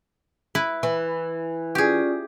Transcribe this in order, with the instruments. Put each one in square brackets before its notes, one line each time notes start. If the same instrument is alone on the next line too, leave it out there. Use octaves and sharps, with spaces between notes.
[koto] E4 B4
[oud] E3
[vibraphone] C#4 F4 D5 [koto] G4 G#4